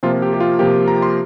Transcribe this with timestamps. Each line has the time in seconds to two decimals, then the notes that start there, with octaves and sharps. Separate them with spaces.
0.03 C3 F3 A#3 F4
0.22 G4
0.34 G4
0.40 F4
0.59 C3 F3 A#3 G4
0.88 A#5
1.02 C6